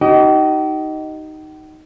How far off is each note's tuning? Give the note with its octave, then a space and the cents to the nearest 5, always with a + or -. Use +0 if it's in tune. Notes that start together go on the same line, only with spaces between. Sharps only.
D#4 +0 G4 -45